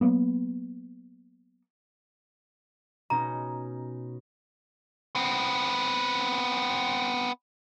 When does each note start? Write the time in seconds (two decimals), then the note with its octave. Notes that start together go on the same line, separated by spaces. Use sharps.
0.01 F#3 A#3 B3
3.10 B2 C#4 D#4 A#5
5.15 B3 C4